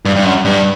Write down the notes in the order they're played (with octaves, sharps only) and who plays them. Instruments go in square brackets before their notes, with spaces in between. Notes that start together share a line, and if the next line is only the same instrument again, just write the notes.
[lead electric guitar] G2
G2
F#2
G2